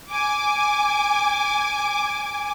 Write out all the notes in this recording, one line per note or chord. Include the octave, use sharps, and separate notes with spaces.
G#5 D6